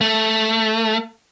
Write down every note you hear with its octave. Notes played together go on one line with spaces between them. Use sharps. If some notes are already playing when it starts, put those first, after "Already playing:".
A3